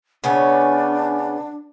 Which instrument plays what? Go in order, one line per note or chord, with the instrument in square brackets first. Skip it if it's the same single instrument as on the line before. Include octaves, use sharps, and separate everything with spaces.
[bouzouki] C#3 B3 C#4 [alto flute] D4